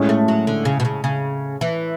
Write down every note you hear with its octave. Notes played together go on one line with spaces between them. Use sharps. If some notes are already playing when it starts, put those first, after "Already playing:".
Already playing: A2 G#3 C#4
A3
F#3
D3
C#3
B2
C#3
C#3
E3